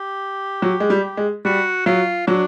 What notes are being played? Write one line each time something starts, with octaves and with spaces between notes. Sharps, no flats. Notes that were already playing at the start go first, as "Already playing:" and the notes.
Already playing: G4
F#3
G#3
G3
G#3
G3 F#4
F#3 F4
F#3 D4